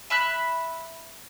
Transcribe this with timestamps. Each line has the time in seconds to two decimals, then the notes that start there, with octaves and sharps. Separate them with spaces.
0.10 E5 B5 F#6